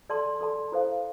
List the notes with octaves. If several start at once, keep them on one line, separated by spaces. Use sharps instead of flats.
A4 D5 A5 C6
A4 D5 A5 C6
E4 A4 C5 F5